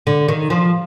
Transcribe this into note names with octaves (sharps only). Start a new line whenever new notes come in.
D3
D#3
F3